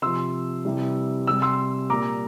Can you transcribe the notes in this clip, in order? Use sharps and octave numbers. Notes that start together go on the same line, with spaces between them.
C3 F3 C6 E6
C3 E3 G3
C3 G3 E6
C6 E6
A#2 G3 A#5 D6